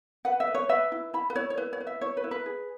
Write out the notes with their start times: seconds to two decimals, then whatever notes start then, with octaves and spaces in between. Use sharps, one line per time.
0.25 B4 F#5
0.40 E5
0.47 B4
0.55 C#5
0.69 B4 E5
0.92 E4
1.13 E4 B5
1.30 B4
1.36 E4 C#5
1.50 C#5
1.58 E4 B4
1.73 C#5
1.80 B4
1.87 E5
2.01 E4 C#5
2.17 B4
2.24 E4
2.31 B4
2.46 G#4